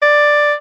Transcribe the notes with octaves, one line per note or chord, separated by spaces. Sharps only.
D5